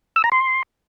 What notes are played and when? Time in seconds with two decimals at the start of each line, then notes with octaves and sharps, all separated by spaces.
0.16 E6
0.24 A#5
0.32 C6